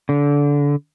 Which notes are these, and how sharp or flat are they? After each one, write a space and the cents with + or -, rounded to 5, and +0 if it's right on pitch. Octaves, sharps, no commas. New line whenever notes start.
D3 -25